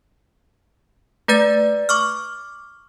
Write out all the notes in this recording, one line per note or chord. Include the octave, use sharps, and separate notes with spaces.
A3 B4 D5 G6 A6
C#6 D6 F6